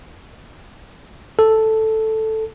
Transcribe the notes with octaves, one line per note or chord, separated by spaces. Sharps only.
A4